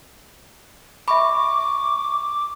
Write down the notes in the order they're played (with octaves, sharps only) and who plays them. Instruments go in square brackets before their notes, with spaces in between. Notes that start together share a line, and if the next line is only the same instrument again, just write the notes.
[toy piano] E5 B5 [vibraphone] C#6 [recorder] D6